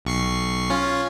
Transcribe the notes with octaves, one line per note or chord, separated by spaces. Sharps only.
B1 C#6 C7
C#4 F4